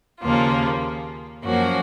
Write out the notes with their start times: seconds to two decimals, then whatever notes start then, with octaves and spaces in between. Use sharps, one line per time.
0.20 D#2 C#3 F3 A#3 F4
1.44 F#2 F3 A#3 C#4 F#4